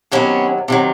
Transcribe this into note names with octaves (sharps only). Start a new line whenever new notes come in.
C3 D#3 F#3 B3 C#4
C3 D#3 F#3